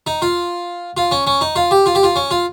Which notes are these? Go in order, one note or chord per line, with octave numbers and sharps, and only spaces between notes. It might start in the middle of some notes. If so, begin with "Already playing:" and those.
D#4
F4
F4
C#4
C#4
D#4
F4
G4
F4
G4
F4
C#4
F4